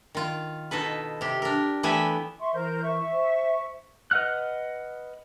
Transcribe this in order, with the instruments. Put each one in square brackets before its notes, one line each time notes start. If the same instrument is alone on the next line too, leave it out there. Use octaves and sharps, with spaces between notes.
[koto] D#3 F4
B2 D#4 A4 B4
C3 G4
D4 A#4
E3 A3 B3 G4 E5 G#5
[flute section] E5 C6 C#6
[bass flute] E3 [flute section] A#4 C5 G6
[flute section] E5 C#6
[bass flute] C5
[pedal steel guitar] B4 D#5 F#5 F6 F#6